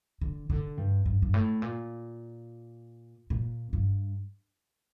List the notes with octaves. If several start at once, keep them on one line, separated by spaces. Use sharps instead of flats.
D3
D3
G2
G2
G2
A2
A#2
A#2
G2